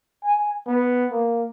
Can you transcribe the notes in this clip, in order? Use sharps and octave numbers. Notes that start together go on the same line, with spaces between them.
G#5
B3
A#3